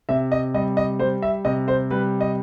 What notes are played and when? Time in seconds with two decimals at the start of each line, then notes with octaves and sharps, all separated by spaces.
0.09 C3 E5
0.32 D#5
0.54 G3 D#5
0.77 D#5
0.99 G3 C5
1.22 E5
1.45 C3 D#5
1.68 C5
1.91 G3 B4
2.21 D#5